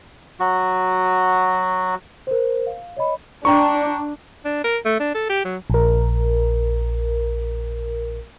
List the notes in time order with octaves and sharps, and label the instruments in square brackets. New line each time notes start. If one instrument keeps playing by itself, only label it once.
[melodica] F#3 F#4
[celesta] A#4 C5
F5
C#5 D#5 B5
[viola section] D4 [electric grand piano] G5 A#5 C#6
[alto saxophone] D4
A#4
A3
D4
A4
G4
F#3
[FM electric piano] A#1 A#4